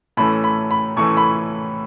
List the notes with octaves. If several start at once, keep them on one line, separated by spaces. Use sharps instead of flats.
A2 E3 A3 C#4 B5
B5
B5
A2 E3 A3 C#4 C#6
B5